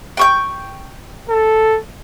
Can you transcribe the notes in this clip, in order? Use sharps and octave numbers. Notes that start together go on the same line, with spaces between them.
G5 C#6 G6
A4